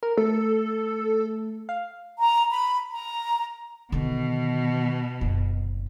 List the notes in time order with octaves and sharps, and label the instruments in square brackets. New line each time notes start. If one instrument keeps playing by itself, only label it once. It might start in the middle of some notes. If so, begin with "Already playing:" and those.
[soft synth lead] A#4
[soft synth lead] A3 [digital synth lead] A4
[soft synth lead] F5
[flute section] A#5
B5
A#5
[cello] B2 [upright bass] D3 D#3
[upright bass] F#1 D3